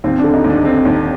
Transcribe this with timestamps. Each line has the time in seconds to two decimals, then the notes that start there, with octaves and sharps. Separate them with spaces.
0.04 D#2 C4
0.19 D3 D4
0.34 D#4
0.44 D#2
0.50 D4
0.64 D3 C4
0.85 D#2